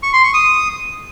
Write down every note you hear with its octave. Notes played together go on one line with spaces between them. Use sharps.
C#6
C6
C#6
D#6